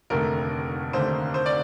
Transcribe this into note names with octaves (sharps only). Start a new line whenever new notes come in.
F1 D#2 D3 A3 A#4
F1 D#2 D3 A3 C5
C5
D5